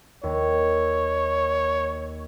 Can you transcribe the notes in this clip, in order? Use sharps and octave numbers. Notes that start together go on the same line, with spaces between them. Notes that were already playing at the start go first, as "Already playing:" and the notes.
D#2 C#5